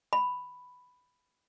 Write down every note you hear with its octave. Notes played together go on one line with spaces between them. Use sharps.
B5